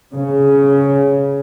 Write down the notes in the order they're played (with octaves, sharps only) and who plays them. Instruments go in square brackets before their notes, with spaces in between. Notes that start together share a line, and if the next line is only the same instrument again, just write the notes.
[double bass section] C#3